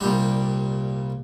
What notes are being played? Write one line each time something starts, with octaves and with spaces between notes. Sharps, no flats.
C2 A#2 G3 D4